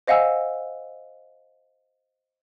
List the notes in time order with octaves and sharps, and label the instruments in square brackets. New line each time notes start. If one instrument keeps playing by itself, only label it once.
[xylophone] C5 D#5 F5 F#5 G#5 E6